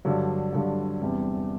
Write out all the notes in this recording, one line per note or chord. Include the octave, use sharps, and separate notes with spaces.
G2 D3 F#3
G2 D3 F#3
E2 C3 G3 D4